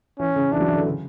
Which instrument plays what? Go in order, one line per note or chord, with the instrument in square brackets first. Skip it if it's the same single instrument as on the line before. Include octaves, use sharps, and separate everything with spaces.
[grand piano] E3 [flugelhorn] C#4
[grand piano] C#3
[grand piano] E3 [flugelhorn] D4
[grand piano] F#3
E3
D3
C#3